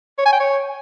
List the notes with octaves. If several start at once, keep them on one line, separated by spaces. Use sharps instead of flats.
C#5
G#5
G5
C#5